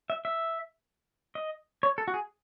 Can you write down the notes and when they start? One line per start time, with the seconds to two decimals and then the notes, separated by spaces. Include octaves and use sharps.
0.10 E5
0.25 E5
1.35 D#5
1.83 C#5
1.98 A4
2.08 F#4
2.14 G#4